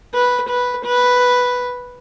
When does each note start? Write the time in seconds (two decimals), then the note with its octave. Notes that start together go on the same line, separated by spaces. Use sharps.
0.14 B4
0.49 B4
0.85 B4